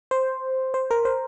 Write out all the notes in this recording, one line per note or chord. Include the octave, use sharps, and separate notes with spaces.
C5
C5
A#4
C5